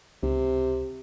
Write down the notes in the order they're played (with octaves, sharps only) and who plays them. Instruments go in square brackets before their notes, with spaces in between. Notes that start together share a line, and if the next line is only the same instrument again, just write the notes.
[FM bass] C#2 [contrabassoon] C3